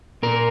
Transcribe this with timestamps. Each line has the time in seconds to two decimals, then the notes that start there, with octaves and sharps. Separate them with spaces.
0.23 A#2 A#4